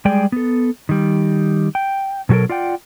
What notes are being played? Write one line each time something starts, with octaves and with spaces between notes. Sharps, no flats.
G3 G#3 G#4 D5 G5
B3 A4
D#3 G3
G5
B2 F#3 F#4 A4 A#4
F4 D5 F#5 G5